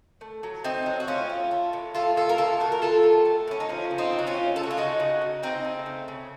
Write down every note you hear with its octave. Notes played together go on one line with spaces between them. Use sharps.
A3
F#3
A3 C4 D#4
F#3
F#4
A2 C#4 F4
A3
A3
A2
A3 F4 A4
A2 F4 A4
A#4
A2 F4 A4
A3 F#4 A#4
A#4
A3 F4 A4
A2
A3
A2 C#4
D#4
F3 C#4 F4
C#3
C4 D#4
C#3
F#4
C#4 F4
A3
C#3 A4
F#4
F4
C#3 D#4 F#4
C#3
C#3
C#3 C4 D#4
A3
C#3
C#3